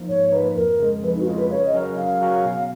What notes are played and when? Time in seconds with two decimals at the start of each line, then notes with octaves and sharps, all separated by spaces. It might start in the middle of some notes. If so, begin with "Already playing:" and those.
Already playing: F3 A#3 D#4
0.09 G#2 C#5
0.32 F3 A#3 D#4 B4
0.55 F2 A#4
0.79 C#3 G#3
1.03 F2 B4
1.15 D#4
1.21 F#4
1.26 C#3 G#3 F4
1.38 B4
1.51 C#3 C#5
1.66 D#5
1.74 F#3 C#4 F#4 A#4
1.97 C#3 F5
2.21 F#3 C#4 F#4 A#4
2.44 B2